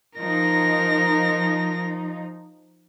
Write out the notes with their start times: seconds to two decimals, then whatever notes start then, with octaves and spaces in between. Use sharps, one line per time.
0.19 F3 D#4 A#4 A#6